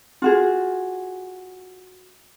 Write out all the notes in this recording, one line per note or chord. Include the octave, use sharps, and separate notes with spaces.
F4 F#4 G#4